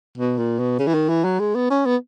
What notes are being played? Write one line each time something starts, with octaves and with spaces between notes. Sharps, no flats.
B2
A#2
B2
C#3
E3
D#3
E3
F#3
G#3
B3
C#4
B3